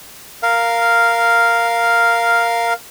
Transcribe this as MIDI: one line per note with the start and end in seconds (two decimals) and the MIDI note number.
0.43 2.73 70
0.43 2.73 77